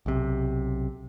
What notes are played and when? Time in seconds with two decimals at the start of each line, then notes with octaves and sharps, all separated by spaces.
0.06 B1 C3